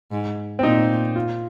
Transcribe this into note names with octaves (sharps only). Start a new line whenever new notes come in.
G#2
C4
A#2 D#4
F4